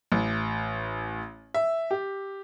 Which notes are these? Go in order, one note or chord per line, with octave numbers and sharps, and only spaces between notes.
A1
E5
G4